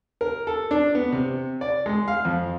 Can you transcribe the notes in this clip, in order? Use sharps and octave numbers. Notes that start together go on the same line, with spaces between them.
A#4
A4
D4
B3
C3
D5
G#3
F5
F2